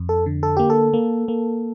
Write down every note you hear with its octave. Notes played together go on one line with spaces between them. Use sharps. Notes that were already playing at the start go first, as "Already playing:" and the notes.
Already playing: F2
A4
D3
A4
A#3 G4
A4
A#3
A#3